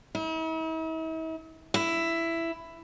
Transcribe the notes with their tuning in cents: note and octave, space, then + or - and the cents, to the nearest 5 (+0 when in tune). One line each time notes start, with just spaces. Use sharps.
E4 -45
E4 +10